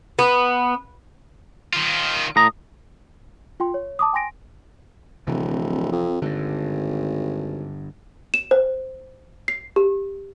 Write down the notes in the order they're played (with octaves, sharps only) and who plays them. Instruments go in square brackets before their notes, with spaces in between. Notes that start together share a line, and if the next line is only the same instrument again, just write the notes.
[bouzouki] B3
[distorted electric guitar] D#3 F4
[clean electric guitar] A2 A#5 [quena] D#6
[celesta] F4 G5 C6
C#5
A5 D6 D#6
G5 G#5 C6 A#6 D7
[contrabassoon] D1 [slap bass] C3 E3 F3
[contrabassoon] F2
[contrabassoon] G#1 [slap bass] G2 D3
[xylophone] E7
C5
C7
G4